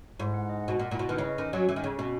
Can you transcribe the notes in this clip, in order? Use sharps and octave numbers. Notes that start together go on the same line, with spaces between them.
G#2 E4
F#5
D#5
B2 F#5
A#2 F#5
A#2
E4
B2
D#3 B4
C#3
D#5
D#3 C#4
F#3 G#5
E3 C#4
D#3
C#3 C#4
B2 F#4